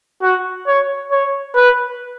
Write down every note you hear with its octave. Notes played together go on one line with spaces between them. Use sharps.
F#4
C#5
C#5
B4